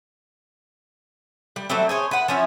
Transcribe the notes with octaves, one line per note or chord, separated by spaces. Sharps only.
G3
F#3 G3 A3 C4
G#4 C5 C#5
B4 F#5
F3 C#4 E4